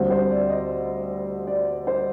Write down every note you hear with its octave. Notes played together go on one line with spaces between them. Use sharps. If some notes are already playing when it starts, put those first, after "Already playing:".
Already playing: D2 D3 G3 C4 C5
C5
D5
D#5
D5
C5